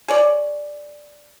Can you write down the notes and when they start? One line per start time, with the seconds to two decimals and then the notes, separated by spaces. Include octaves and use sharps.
0.08 G#4 C#5 D5